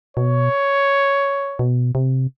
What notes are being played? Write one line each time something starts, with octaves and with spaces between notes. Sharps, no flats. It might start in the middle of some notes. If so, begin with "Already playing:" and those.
B2 C#5
B2
C3